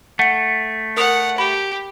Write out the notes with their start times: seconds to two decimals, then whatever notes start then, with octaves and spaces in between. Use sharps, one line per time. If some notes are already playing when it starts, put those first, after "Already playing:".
0.19 A3 F#5 C#7
0.97 A#4 F#5 D#6 F7
1.38 G4 B5